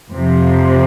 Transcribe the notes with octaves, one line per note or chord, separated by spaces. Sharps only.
F2 C3 F3